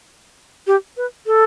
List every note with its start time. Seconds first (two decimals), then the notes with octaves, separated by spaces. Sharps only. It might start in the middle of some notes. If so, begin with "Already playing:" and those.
0.67 G4
0.97 B4
1.26 A4